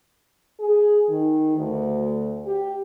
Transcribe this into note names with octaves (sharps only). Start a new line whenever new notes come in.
G#4
D#3
D2
G4